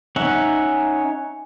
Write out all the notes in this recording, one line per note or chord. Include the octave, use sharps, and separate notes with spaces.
C#4 D#4 C#5 E5 F#5